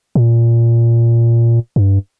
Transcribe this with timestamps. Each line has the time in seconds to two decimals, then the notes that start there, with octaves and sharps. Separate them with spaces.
0.15 A#2
1.76 G2